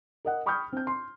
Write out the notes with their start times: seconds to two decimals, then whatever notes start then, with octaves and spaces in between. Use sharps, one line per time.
0.25 A#4 D#5 F#5
0.46 G5 B5 C#6 D#6 F6 G6
0.73 C4 G6
0.87 C6